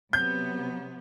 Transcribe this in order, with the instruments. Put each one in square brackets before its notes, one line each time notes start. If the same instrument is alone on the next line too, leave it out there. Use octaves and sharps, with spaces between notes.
[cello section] C3 F#3 B3 [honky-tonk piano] G6